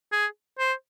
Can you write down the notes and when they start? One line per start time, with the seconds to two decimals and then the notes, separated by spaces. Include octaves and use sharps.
0.12 G#4
0.59 C5